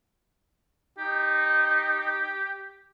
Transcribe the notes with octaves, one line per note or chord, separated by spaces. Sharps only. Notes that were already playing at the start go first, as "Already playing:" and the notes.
D#4 G4